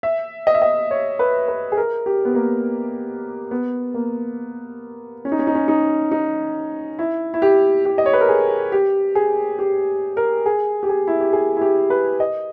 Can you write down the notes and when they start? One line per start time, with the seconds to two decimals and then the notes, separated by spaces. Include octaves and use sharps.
0.03 E5
0.47 D#5
0.54 E5
0.62 D#5
0.91 C#5
1.19 B4
1.48 B4
1.72 G#4
1.77 A#4
2.06 G4
2.25 B3
2.35 A#3
3.51 B3
3.94 A#3
5.25 C#4
5.32 D#4
5.39 C#4
5.47 D#4
5.55 C#4
5.68 D#4
6.12 D#4
6.99 E4
7.34 E4
7.42 G4
7.85 G4
7.98 D#5
8.06 C#5
8.13 B4
8.21 A#4
8.29 G#4
8.72 G4
9.15 G#4
9.59 G4
10.17 A#4
10.46 G#4
10.83 G4
10.89 G#4
11.07 E4
11.20 G4
11.33 G#4
11.57 E4
11.61 G4
11.90 B4
12.20 D#5